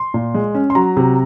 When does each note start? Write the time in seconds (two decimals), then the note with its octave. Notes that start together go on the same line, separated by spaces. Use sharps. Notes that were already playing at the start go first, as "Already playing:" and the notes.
Already playing: C6
0.14 A#2
0.34 G#3
0.55 C#4
0.70 C6
0.75 F#3 A#5
0.97 C3